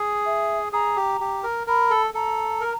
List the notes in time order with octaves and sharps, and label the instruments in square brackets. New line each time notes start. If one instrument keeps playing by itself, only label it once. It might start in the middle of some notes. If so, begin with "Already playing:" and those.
Already playing: [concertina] G#4
[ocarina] E5
[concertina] G#4 [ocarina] A#5
[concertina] G4
G4
A#4
[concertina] A#4 [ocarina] B5
[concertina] A4
[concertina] A4 [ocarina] A#5
[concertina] A#4